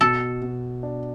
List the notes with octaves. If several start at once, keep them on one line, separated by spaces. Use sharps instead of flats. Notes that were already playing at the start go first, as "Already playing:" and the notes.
B2 A4
B2
D4